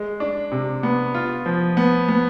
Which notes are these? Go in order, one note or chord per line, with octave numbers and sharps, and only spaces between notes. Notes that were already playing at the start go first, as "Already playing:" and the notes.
Already playing: G#3
D4
C3
B3
F4
F3
B3
B3